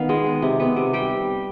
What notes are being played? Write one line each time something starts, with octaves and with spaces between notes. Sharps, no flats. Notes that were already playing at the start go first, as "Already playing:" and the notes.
Already playing: D#3 B3 F5
G#3
B3
C3
B3
C3
G3 G5